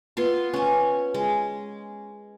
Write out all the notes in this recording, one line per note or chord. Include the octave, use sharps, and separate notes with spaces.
B3 F4 C6
C#4 G#5
G#3